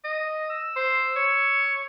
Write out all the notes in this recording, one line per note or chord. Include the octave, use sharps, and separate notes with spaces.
D#5
E6
C5
C#5